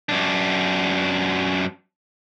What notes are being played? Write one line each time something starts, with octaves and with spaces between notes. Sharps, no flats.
F#2 D4